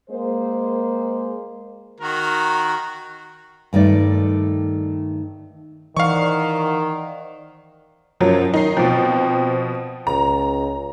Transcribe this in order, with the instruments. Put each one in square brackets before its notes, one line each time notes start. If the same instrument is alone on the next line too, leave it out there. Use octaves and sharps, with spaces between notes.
[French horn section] G#3 A#3 C5
[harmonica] D#3 F#4 A#4
[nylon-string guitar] G2 D#3 A3 D5
[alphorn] D#3 [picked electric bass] E3 [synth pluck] C5 D5 F#5 [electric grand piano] F5 C#6
[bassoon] F#2 [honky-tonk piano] F3 F#3
[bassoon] D#3 [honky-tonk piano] D#4 C7
[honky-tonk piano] B2 F3 [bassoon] C4
[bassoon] C#2 [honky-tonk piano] A#5